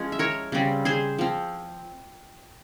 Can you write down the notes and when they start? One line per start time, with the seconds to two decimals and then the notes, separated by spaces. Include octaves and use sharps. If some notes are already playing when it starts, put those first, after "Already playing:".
Already playing: F3 G#3 C#4
0.12 E5
0.19 A#4 C#5
0.52 C#3 G3 C4
0.85 G#4 C5
1.19 F3 C4